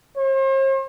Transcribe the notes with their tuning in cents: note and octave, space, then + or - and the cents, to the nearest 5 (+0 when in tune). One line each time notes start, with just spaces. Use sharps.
C5 +45